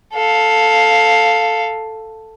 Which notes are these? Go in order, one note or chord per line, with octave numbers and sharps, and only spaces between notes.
A4 F5